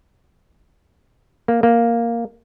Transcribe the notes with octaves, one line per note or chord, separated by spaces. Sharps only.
A#3
A#3